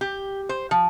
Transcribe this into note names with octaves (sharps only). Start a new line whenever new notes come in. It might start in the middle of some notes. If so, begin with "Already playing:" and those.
G4
C5
F3